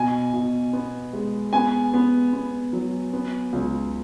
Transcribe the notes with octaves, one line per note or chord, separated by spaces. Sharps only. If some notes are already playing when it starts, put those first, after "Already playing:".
Already playing: B2 G#5
B2
B3
G#3
B3 G#5
B3
B3
F#3
B3
C#2